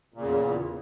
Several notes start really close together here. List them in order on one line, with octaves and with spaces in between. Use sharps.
A#2 C#3 E2